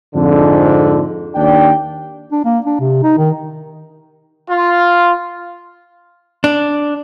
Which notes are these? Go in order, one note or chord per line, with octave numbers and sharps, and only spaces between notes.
F2 G#2 D3
D#2 D4 G5
D4
A#3
D4
C3
D#4
D#3
F4
D4